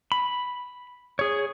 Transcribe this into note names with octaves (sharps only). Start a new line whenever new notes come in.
B5
G#4 C#5